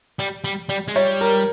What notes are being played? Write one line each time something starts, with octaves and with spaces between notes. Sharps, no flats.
G3
G3
G3
G#3
G3 C#5
A#4